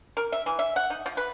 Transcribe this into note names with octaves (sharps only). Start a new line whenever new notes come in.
A#4
E5
E3
E5
F#5
D#4
F3
B4